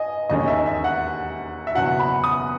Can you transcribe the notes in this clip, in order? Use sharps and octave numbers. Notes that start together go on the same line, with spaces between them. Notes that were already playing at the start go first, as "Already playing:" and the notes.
Already playing: D#5 G#5
E1 D#2 D#3 G#3 C#4 D#5
E5
E5
F#5
E5
F#1 E2 B2 F#3 F#5
B5
D#6